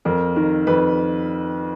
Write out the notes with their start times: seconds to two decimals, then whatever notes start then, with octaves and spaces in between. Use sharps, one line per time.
0.05 F2 A#4
0.36 D#3 A#4
0.67 F2 B4